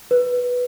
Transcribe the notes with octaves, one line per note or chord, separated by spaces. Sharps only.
B4